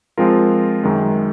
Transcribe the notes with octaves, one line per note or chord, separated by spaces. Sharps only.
F3 G#3 C4 F4 A#4
F#2 D#3 G#3